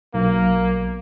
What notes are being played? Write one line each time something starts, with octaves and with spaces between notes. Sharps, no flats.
B1 A#3